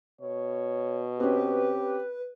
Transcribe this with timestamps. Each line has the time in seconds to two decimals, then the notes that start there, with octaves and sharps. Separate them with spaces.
0.21 B2 C#5
1.20 C4 C#4 G4 B4